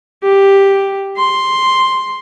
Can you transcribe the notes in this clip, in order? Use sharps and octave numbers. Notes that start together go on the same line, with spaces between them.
G4
C6